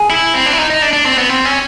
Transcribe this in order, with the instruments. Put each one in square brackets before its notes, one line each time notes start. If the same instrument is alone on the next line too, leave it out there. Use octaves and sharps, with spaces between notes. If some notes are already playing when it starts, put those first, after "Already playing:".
Already playing: [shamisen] G#4
[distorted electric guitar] E4
C4
D4
E4
D#4
D#4
D4
D4
C4
B3
C4
C#4